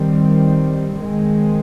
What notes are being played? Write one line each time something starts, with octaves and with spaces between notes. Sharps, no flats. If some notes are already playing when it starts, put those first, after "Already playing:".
Already playing: D#3 G3 C4
D#3 G#3 C4